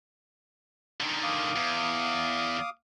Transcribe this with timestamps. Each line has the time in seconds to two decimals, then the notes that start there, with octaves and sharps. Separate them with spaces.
1.00 D3 D#3
1.23 F5 D6 D#6
1.56 E2